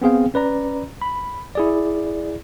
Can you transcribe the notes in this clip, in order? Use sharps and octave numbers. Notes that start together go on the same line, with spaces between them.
B3 C4 G#4 F5 G5
C#4 B4 D5 A#5
B5
E4 G#4 D5